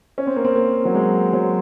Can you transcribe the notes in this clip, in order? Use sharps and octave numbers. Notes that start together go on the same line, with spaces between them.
C#4
C4
A#3
C4
A#3
F#3
G#3
F#3